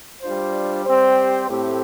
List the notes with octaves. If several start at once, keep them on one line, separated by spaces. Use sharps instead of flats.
G3 D4 F4 C5
G3 C4 G4 C5
A2 A3 C4 G4